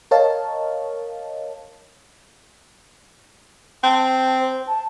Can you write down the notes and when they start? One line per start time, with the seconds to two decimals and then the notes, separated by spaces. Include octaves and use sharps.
0.11 A#4 C#5 D#5 F5 A5
3.84 C4 A5
4.40 C5
4.67 A5